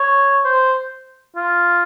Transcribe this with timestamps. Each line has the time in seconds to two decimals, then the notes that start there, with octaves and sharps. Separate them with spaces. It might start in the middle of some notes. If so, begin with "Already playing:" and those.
Already playing: C#5
0.45 C5
1.36 F4